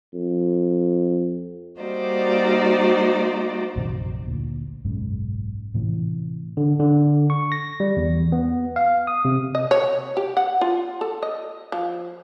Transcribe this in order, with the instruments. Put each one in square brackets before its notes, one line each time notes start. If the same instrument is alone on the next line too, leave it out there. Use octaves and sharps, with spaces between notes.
[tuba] F2
[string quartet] G3 A#3 D#4 F#4 C5 D5
[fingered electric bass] A#1 F#2 C3 D#3
D2 A#2
F#1 B1 G#2 C#3
A2 C3 E3
[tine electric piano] D3
D3
C#6
A#6
G3
E2
B3
F5
D#6
C3
[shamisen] D#5
C#5
G4
F#5
F4
A4
D#5
F3